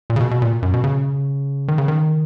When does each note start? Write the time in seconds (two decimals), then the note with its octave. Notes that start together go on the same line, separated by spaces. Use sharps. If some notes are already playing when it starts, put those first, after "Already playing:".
0.10 A#2
0.16 C#3
0.20 B2
0.31 B2
0.42 A#2
0.62 F#2
0.74 B2
0.84 C#3
1.68 D#3
1.78 C#3
1.88 D#3